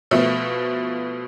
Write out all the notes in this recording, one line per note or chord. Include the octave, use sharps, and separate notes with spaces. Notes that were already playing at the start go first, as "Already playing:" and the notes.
B2 F3 A3